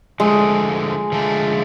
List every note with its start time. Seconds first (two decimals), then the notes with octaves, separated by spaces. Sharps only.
0.20 D3 F3 G#3 A3
1.12 D3 F3 A3